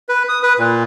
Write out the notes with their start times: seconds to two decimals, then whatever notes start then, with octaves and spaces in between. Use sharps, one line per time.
0.09 B4
0.29 D#6
0.43 B4
0.59 A#2